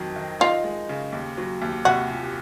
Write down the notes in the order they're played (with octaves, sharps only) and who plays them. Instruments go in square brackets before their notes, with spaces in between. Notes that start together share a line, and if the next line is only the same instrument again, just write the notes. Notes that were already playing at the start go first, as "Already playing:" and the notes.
Already playing: [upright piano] F2 D#3 F#3
D#3
[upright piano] D#4 [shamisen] F4
[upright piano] G#3
C#3
D#2
F#3
D#2
[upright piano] C2 [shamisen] F#4
[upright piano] A#2